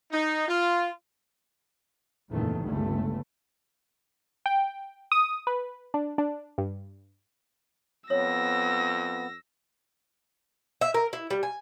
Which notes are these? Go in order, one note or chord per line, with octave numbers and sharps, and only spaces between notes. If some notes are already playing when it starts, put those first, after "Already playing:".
D#4
F4
F#1 E2 A#2 D#3 A3
G1 C#2 G2 A3
G5
D#6
B4
D4
D4
G2
F2 B3 C#5 E6 A#6
E5
A#4
E4
G3
G#5